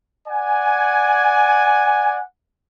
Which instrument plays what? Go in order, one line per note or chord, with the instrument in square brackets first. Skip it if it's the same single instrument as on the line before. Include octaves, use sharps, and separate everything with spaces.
[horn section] D5 F#5 G#5